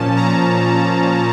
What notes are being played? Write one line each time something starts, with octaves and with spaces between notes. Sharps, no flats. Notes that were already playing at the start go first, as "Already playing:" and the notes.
Already playing: A#2 F3 C#4 A5
A#5